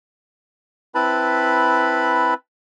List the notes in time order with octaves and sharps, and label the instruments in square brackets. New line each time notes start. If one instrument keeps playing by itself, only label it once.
[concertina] C4 E4 B4 A5 B5